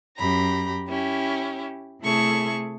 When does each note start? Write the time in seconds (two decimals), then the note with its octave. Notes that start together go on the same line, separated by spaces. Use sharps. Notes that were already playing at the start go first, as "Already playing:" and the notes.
0.18 F#2 G4 A#5 B5
0.90 C#4 E4 G4
2.01 C3 A3 E4 G#4 A4 C#6